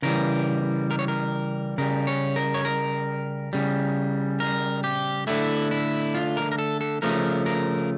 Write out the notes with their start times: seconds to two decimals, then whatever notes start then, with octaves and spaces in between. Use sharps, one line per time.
0.02 C#3 E3 G3 A#4
0.91 A#4
0.99 C#5
1.08 A#4
1.78 C#3 G3 A#4
2.07 C#5
2.36 A#4
2.54 C#5
2.65 A#4
3.53 C#3 G3
4.40 A#4
4.84 G4
5.27 D3 A3 E4
5.71 E4
6.15 F4
6.37 A#4
6.52 A#4
6.59 A4
6.81 A4
7.02 C#3 F3 A3 A#4
7.46 A#4